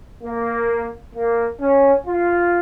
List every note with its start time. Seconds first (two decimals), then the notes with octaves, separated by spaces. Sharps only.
0.23 A#3
1.15 A#3
1.60 C#4
2.06 F4